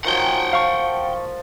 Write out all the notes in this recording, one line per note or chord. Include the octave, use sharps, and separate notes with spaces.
D#3 F3 F#3 F#5 G5
F3 F5 C#6